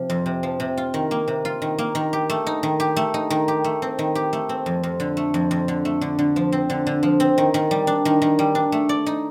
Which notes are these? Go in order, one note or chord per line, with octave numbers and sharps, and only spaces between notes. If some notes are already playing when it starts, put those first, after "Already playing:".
Already playing: C3 F3
F2
C3
F3
C3
F4
D#3
A#3
C3
F4
D#3
A#3
D#3
G4
A3
D#4
D#3
G4
A3
D#4
D#3
G4
A3
C4
D#3
G4
A3
C4
F2
F2
D3
A3
F2
F2
D3
A3
D3
D3
F3
C4
D3
D3
F3
C4
D#3
D#3
G3
D4
D#3
D#3
G3
D4
A3
D5
D#4